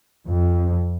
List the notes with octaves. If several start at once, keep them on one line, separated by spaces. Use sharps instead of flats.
F2